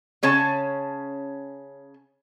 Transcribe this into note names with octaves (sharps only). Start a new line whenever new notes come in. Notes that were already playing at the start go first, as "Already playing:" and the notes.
C#3 C#4 C#5 A5